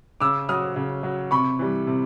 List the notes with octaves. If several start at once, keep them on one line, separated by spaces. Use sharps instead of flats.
C#3 D6 E6
F#3 D#6 F6
C#3
F#3
C3 B5 C#6
E3 G3
C3